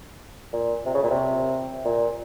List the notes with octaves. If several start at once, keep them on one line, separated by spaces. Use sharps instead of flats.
A#2
C3
C#3
A#2
C3
A#2